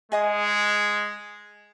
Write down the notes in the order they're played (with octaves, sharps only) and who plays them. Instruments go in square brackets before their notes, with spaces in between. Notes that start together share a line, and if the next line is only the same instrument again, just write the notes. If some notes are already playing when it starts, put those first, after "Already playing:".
[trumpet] G#3 [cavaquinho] G#4 D#5 D#6